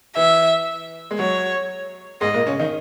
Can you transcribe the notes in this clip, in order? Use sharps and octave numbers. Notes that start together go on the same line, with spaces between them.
E3 E5
G#3
F#3 C#5
G#2 G#3 D#5
A#2 A#3
C#3 C#4
D#3 D#4